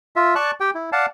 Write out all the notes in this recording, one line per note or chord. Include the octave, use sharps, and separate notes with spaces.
F4 E5
D5 A5 C#6 F#6
G4 G5
E4
D5 F5 F#5 A5